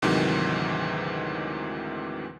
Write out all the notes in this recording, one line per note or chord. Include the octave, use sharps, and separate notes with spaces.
D2 G#2 C3 D#3 E3 F#3